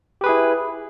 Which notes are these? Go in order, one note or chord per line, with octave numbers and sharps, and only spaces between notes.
E4 G4 G#4 B4